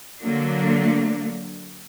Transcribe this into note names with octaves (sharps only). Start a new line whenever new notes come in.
D3 F#3 A#3 D4